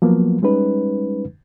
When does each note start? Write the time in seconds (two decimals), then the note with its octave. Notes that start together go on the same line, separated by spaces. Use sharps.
0.02 F3 F#3 A#3 B3
0.42 G3 G#3 C#4 D#4 B4